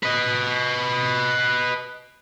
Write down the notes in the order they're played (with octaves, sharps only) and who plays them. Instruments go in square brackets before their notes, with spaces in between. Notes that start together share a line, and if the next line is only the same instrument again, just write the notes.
[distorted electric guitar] B4 D#5